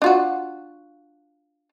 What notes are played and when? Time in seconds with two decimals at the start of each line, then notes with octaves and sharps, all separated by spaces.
0.02 D4 F4 F#4